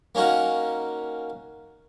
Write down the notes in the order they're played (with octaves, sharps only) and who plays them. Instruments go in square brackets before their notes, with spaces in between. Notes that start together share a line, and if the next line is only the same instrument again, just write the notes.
[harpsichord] A#3 C#4 D#4 F#4 A#4